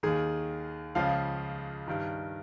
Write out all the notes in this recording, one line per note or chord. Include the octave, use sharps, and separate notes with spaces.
D#2 D#3 G#4
C#2 C#3 F3 F5
G2 D#3